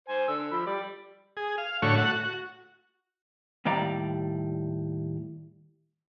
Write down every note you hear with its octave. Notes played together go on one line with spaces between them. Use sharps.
C5 G#5
D3 E6
F3 B5
G3 D5
G#4
F5
A2 D3 A3 F#4 C#5 C#6
A3 F#4 F#5
F#4
D#2 A2 G3 D5 F5 A#5